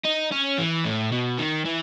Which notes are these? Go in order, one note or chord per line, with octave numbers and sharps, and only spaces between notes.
D#4
C#4
E3
A2
B2
D#3
E3